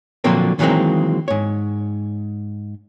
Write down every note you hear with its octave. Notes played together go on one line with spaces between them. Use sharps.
A#2 D3 F3 F#3 A#3 C4
D#3 E3 F#3 G#3 A#3 C4
G#2 C#5